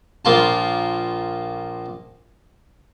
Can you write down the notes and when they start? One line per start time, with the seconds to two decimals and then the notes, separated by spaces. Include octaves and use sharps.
0.25 A#1 A#3 F4 A5